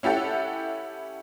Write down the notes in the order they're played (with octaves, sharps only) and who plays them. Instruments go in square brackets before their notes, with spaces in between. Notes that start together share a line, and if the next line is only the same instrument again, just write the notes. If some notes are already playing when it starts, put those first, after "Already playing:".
[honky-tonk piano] C#4 E4 G4 A4 F#5